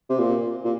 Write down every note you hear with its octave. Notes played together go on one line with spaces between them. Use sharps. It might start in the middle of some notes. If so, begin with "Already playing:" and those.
C3
A#2
A#2